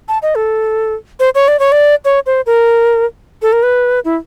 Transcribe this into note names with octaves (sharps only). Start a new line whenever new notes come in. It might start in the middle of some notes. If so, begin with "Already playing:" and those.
A5
D#5
A4
C5
C#5
D5
C#5
D5
C#5
C5
A#4
A4
A#4
B4
E4